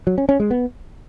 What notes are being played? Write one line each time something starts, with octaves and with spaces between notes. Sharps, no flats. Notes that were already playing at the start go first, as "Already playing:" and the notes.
F#3
C#4
C#4
G#3
B3